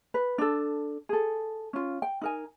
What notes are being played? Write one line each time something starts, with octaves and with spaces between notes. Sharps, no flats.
B4
D4 A4
G#4 A4
C#4 F4
G5
D#4 A#4 G#5